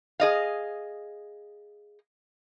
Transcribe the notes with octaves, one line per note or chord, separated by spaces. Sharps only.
G#4 D#5 F5